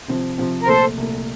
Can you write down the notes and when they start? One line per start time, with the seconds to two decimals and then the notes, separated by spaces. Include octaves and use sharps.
0.08 C3 F3 C4
0.38 C3 F3 C4
0.62 A#4
0.67 C2 A#2 A3 A4 C5
0.98 C2 A#2 A3